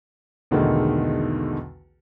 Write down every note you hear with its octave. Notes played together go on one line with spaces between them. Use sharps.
B1 E2 D3 D#3 G#3 A3